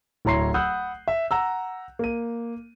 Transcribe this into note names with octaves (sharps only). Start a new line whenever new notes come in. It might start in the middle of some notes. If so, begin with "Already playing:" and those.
D1 E4 C#5 A#5 C6 C7
F#5 B5 D#6 E6 F#6 G6
E5
F#5 A#5 E6
A#3 D#7